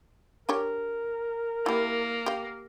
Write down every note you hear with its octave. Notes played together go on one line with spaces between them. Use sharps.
D4 G4 A#4 C#5
A#3 E4 G4
G4 F5